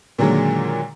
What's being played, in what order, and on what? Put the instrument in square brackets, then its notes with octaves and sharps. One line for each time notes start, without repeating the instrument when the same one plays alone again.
[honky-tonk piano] A#2 D3 D#3 F#3 G#3 A#3